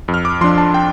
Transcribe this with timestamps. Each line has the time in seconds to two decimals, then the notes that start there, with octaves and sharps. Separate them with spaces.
0.08 F2
0.14 F6
0.25 D6
0.41 F3 D4 C6
0.58 A5
0.74 G5